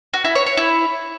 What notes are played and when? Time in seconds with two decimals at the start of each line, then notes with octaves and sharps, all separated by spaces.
0.14 F#4
0.24 E4
0.35 C#5
0.46 C#5
0.57 E4